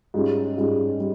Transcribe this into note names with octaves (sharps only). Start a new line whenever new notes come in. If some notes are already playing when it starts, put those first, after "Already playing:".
G#2 G3 C#4 F4
G#2 G3 C#4 F4
G3